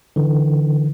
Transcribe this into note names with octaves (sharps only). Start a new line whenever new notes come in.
D3 E3